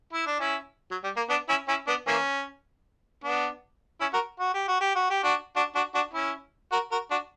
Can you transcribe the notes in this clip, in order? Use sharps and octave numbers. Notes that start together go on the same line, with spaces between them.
E4
D4
C#4 E4
F#3
G3
A#3
B3 D4
C#4 E4
C#4 E4
B3 D4
E3 A#3 C#4
B3 D4
C#4 E4
F#4 A#4
F#4
G4
F#4
G4
F#4
G4
D4 F#4
D4 F#4
D4 F#4
D4 F#4
C#4 E4
F#4 A#4
F#4 A#4
D4 F#4